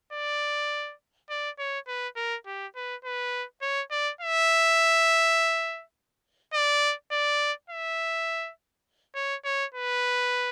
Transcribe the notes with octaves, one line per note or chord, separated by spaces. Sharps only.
D5
D5
C#5
B4
A#4
G4
B4
B4
C#5
D5
E5
D5
D5
E5
C#5
C#5
B4